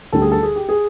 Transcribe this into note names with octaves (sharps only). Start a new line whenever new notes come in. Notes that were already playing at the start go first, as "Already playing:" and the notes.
D2 D3 G3 A4
G#4
A4
G#4
G4
G#4